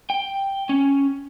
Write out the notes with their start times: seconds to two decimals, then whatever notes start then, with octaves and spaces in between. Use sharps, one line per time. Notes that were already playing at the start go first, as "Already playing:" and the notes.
0.10 G5
0.69 C#4